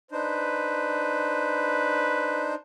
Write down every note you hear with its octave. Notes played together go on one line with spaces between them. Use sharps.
D4 D#4 B4 C5